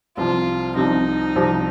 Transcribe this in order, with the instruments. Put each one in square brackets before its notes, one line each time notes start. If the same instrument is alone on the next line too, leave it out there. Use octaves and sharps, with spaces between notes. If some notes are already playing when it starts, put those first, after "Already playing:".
[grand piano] C2 C3 F3 [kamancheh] F4
[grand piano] C2 C3 F3 [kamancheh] D#4
[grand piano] C2 C3 F3